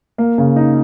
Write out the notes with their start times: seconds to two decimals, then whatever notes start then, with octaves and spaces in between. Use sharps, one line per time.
0.18 A#3
0.38 C#3
0.56 D#4